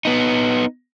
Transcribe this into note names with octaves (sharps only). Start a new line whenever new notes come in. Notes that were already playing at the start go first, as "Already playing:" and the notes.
B3 D#4